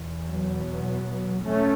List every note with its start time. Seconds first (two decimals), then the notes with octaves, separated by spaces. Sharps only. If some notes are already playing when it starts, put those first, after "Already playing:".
Already playing: E2 B2
0.30 F#3 B3
1.44 A3 C#4